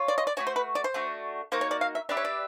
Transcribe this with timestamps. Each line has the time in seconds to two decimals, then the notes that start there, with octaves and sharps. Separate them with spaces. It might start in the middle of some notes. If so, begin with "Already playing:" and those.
Already playing: F4 C#5
0.08 D5
0.18 D#5
0.27 D5
0.37 A3 D4 F#4 C#5
0.47 C5
0.56 B4
0.75 D5
0.84 C5
0.94 A3 D4 F#4
1.52 A#3 D#4 F#4 C5
1.61 C#5
1.71 D5
1.81 F5
1.95 E5
2.09 D4 G4 B4 D5 E5
2.17 C#5
2.25 D5